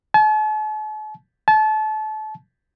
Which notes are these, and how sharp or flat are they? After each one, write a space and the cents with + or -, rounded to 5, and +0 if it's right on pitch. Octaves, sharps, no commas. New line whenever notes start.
A5 -45
A5 -30